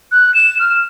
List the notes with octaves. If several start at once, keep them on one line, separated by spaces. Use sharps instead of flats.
F#6
E7
F6